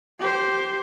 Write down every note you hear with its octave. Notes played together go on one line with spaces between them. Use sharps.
G4 C5